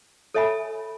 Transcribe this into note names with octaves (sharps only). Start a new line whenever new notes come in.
A4 C#5 E5 G#5 B5